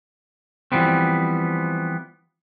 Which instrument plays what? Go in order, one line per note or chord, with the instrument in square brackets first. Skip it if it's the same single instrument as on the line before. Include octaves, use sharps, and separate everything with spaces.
[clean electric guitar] E3 F3 G3 B3 C4